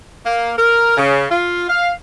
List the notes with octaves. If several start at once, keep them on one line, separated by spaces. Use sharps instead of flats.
A#3
A#4
C#3
F4
F5